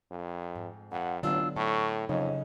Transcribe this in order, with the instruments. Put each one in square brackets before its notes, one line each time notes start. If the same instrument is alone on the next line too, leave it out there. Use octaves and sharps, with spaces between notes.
[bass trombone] F2
[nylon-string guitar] G#2
[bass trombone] F2 [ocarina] F#5
[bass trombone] A1 [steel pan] D3 F#3 B3 [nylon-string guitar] D4 F4 [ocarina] E6
[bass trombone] A2 [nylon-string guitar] A4 [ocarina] C#6
[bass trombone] F2 [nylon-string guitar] C#3 [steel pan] F#3 D#4 C#5 [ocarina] D#5